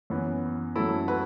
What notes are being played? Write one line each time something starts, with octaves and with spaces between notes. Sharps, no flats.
F#2 E3 B3
F#2 F#3 A3 E4 A4
F#4 B4